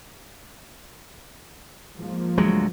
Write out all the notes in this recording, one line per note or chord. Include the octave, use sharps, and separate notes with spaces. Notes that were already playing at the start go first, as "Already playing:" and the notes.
G#2 F3 A#3
D2 F#3 G#3